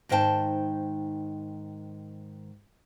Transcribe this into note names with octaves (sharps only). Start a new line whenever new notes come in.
G#2 D#3 C5 F5 G5 A5